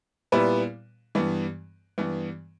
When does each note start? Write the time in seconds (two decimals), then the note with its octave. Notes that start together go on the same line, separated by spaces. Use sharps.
0.32 A#2 G3 B3 E4 B4
1.15 G2 E3 B3
1.98 G2 E3 B3